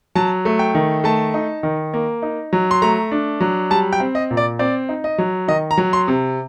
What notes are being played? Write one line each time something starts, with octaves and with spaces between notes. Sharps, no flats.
F#3 A5
A3
G5
D#3
A3 A5
D#4
D#3
A#3
D#4
F#3
C6
A3 A#5
D4
F#3
G3 A5
G5
C4
D#5
A#2
D5
C4 D5
D#4
D#5
F#3
D#3 D#5
A#5
F#3
C6
C3